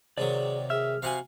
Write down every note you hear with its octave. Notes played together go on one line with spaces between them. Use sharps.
C3 D#3 F#3 G#4 D5
G#4 E5 F6
C3 F#4 F5 F#5 G#5